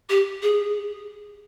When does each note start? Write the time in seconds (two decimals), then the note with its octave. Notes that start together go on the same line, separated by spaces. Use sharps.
0.09 G4
0.42 G#4